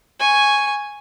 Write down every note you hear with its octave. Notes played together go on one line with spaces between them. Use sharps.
G#5 C#6